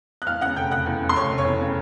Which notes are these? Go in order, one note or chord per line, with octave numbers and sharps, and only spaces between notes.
F#6
E2 F5 F6
C#3 F#5 F#6
F1 G5 G6
F1 F#5 F#6
E2
C#3
C6
F1 C#5 C#6
F1
C#5 C#6
E2
C#3